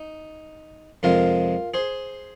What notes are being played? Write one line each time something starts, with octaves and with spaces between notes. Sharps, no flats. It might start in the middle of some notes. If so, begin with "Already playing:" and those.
Already playing: D#4
F2 C3 G#3 F4 A#4
G#4 C5